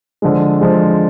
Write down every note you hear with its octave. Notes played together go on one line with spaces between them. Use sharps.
D3 F3 G#3
D3 F3 G#3